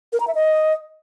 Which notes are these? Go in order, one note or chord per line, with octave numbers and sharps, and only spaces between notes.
A#4
A#5
E5
D#5